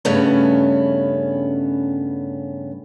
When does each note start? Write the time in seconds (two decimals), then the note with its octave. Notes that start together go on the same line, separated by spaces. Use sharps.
0.05 G2 C#3 A3 B3 C#4